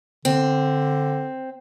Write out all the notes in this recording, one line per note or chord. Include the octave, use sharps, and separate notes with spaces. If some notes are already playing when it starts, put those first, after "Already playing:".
D3 C4